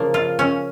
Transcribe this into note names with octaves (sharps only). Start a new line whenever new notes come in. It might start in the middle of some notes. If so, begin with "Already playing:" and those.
Already playing: C#3 F3 A#3
F4
C#4